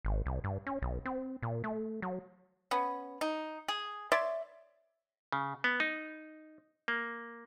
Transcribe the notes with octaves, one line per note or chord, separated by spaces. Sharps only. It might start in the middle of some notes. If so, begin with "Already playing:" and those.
G#1
C2
G2
C#4
B1
C4
A#2
A3
F#3
B3 C#4
D#4
G#4
C#5 D5 E5 C6
C#3
B3
D#4
A#3